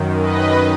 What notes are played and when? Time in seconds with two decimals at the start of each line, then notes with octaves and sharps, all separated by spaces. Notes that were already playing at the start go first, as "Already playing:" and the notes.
Already playing: F#2 D#3
0.20 B4 D#5